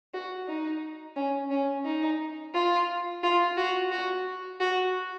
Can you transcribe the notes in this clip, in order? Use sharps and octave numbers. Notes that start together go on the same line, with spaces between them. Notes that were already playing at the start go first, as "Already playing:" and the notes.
F#4
D#4
C#4
C#4
D#4
F4
F4
F#4
F#4
F#4